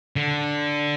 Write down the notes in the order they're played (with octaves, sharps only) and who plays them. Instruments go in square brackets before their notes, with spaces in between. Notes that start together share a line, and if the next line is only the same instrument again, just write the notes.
[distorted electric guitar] D3